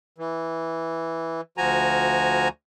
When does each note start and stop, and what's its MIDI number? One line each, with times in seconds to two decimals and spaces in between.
0.18 1.41 52
1.58 2.48 38
1.58 2.48 53
1.58 2.48 66
1.58 2.48 80
1.58 2.48 82